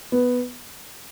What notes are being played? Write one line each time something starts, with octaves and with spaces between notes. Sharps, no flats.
B3